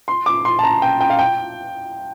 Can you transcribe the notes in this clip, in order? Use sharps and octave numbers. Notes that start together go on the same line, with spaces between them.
C6
D6
C6
A5
A#5
G5
G5
F5
G5